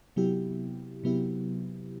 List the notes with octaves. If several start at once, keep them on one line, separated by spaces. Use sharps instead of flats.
C3 F#3 B3 E4 G4
C3 F#3 B3 E4 G4